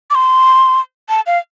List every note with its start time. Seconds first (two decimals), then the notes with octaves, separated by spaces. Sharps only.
0.10 D6
0.15 C6
1.09 A5
1.27 F5